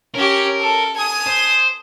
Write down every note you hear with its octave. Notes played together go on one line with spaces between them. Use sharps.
C#4 G4 A#4
A4
G#5 D#6
C5